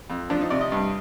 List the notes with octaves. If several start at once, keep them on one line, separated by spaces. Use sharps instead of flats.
F2
F3 D4
D#4
C3 D5
D#5
G2